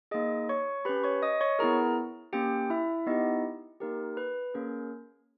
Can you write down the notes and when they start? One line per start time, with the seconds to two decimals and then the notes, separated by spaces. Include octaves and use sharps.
0.11 A#3 D#4 G#4 D#5 D#6
0.49 C#5 C#6
0.85 G4 B4 B5
0.89 C#4
1.03 C#5 C#6
1.22 D#5 D#6
1.41 C#5 C#6
1.59 B3 E4 G#4 A#4 A#5
2.33 A#3 C#4 G4 G5
2.70 E4 E5
3.06 B3 D#4 E4 G4 D#5
3.80 A#3 D#4 G4 A#4
4.17 B4
4.54 A#3 C#4 G#4 A#4